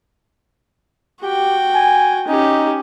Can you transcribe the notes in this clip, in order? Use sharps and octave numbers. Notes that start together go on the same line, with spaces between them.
F#4 G4 G5
G#5
C#4 D#4 G4